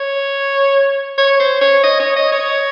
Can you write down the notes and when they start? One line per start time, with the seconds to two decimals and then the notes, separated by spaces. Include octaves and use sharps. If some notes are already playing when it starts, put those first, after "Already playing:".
Already playing: C#5
1.18 C#5
1.40 C5
1.61 C#5
1.83 D#5
2.00 C#5
2.16 D#5
2.32 C#5